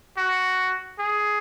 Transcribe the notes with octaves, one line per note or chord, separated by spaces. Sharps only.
F#4
G#4